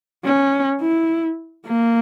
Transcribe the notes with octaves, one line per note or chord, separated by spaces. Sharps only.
C#4
E4
A#3